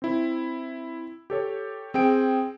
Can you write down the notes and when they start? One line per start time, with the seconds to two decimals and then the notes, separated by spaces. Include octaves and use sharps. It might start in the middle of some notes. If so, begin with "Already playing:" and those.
0.02 C4 E4
1.30 G4 A4 C#5
1.94 C4 G#4 G5 D7